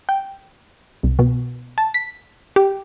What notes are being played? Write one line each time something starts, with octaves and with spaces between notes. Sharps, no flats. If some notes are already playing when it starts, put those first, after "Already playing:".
G5
C2
B2
A5
B6
G4